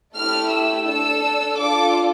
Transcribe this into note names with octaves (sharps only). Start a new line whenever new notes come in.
A3 E4 G4 F6
E6
D4 A4 E6
D4 F4 A4 D6